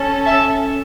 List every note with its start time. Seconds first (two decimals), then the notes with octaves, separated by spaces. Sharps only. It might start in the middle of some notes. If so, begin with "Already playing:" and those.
Already playing: C#4 A4
0.24 E5 A5